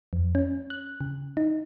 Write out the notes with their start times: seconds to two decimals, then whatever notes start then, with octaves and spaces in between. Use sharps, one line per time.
0.13 F2
0.35 C#4
0.70 F#6
1.01 C#3
1.37 D#4